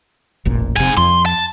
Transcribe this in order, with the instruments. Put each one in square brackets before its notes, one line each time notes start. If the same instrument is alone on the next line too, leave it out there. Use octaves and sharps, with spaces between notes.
[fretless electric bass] E1 A1 A#2
[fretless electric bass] F1 C3 [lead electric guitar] G#2 G#5
[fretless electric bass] F2 [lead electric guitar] C6
[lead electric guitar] A5